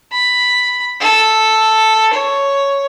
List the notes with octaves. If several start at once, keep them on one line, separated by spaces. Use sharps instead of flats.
B5
A4
C#5